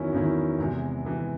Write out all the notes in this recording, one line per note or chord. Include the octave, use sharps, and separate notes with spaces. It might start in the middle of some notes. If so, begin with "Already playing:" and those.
Already playing: E2 D#3 F#3 C#4 E4
E2 D#3 F#3 C#4 E4
E2 C3 E3 G#3
E2 C3 E3 G#3